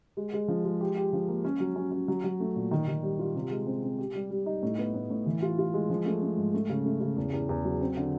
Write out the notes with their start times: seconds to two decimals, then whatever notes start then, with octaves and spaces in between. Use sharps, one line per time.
0.17 G#3
0.33 G#3
0.48 F3
0.65 G#3
0.81 G4
0.97 G4
1.13 F3
1.28 A#3
1.45 C#4
1.60 F#3
1.76 C#4
1.91 C#4
2.08 F#3
2.24 F#3
2.40 A3
2.56 A#2
2.71 D#3
2.88 D#3
3.03 G3
3.19 F4
3.35 C3
3.51 G#3
3.67 C4
3.83 C4
3.99 G4
4.15 G3
4.31 G3
4.46 D#4
4.63 A2
4.78 B3
4.94 A2
5.10 A2
5.26 E3
5.42 F4
5.59 F4
5.74 G#3
5.90 F3
6.06 A3
6.22 A3
6.37 G#2
6.54 A3
6.69 C#3
6.85 A3
7.01 C#3
7.17 E2
7.33 E2
7.49 E2
7.65 F#3
7.81 C4
7.97 D3